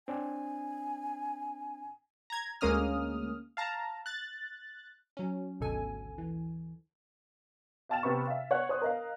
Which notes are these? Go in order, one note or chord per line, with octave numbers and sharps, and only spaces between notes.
C4 D4 G#5
A#5 G#6
D2 G#3 A#3 C#4 D#6 F6
F5 A5 A#5
F#6 A6
F#3 C#4
G#1 D2 B2 A4 G#5
E3
F5 G5 A5 F6 A6 E7
C3 B3 B5 C#6
E5 F5
C#5 F#5 F#6
C5 C#5 D#6
A#4 D#5 F5